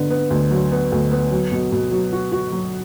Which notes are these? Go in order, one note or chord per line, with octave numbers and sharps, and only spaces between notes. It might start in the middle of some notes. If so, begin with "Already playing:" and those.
Already playing: D3 B3
B3
D2
F#3
B3
D2
B3
F#3
B2
B2
F#3
F#4
F#4
F#3